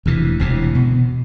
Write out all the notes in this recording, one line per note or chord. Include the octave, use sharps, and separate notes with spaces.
E1 D2 C3 E3
E1 D2 C3 E3
B2